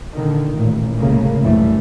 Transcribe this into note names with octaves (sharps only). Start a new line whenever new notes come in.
A#2 D3 D#3
A1 A#2
F1 C#2 C#3 A3 A#3
A#1 F#2 E3 G3 A3